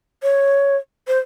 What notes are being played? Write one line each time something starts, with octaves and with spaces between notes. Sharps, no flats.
C#5
C5